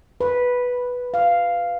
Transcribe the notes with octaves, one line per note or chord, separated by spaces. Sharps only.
B4
F5